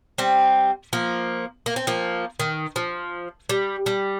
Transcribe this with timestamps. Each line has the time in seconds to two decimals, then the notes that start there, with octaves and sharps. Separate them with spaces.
0.18 G3 C4
0.93 F3 A#3
1.66 A#3
1.76 C4
1.87 F3 A#3
2.40 D#3
2.76 F3
3.49 G3
3.86 G3